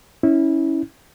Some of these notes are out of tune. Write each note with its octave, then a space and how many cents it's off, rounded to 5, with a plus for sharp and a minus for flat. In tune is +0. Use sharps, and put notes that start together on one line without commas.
C#4 +0 E4 -25